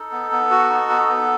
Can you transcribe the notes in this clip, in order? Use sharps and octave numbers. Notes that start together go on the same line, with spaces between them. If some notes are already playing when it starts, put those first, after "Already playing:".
Already playing: D#4 A4
B3
B3
F#4
D#4
B3
B3